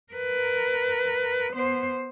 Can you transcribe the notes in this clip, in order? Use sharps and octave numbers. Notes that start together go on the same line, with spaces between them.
A#4 B4
B3 C5